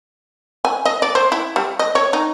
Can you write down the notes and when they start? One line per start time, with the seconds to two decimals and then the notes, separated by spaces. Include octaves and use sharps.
0.65 G#5
0.85 D#5
1.02 D5
1.15 C5
1.32 E4
1.56 G3
1.79 D#5
1.95 C#5
2.13 D#4